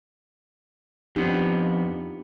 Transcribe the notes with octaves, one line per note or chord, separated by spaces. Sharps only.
F2 B3 D4 D#4 G4